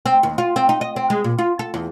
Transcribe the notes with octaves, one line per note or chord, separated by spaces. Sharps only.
C4
D#2
F4
C4
D#4
D#5
C4
G#3
A#2
F4
A4
E2